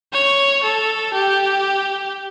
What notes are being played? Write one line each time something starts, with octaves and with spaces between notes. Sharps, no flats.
C#5
A4
G4